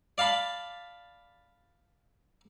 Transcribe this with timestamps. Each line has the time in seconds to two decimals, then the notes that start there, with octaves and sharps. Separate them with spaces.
0.18 D5 F5 A5 B5